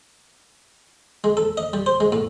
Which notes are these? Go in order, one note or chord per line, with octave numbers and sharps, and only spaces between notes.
G#3
A4
D#5
G3
C5
G#3
A2